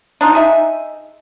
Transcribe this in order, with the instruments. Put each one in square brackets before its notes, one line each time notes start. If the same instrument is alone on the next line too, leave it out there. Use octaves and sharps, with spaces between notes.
[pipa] D4 D#4 F4
D#4 G#4 E5